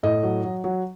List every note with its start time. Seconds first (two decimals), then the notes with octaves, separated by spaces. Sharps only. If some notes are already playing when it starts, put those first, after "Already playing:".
0.03 A2 D#5
0.23 F#3
0.44 F#3
0.64 F#3